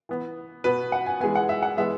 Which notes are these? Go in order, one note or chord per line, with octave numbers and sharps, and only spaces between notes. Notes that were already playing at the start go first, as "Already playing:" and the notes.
E3 B3
B2 B3 B4
F#5
G#5
E3 G#3 B3 G#5
F#5
E5
F#5
E3 G#3 B3 E5